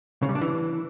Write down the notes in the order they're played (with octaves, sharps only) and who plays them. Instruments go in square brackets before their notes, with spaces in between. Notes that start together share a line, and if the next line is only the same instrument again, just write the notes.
[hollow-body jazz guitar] C#3
G3
D4
E3